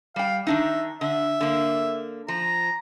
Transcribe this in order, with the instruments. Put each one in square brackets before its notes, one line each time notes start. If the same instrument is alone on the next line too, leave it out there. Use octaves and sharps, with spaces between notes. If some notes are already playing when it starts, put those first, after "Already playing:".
[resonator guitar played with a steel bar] G3 G5 [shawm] F5
[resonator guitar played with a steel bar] D#3 D4 D#4 [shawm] E5
[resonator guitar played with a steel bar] D3 [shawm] E5
[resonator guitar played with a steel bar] D3 A#3
[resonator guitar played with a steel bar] F3 [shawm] A#5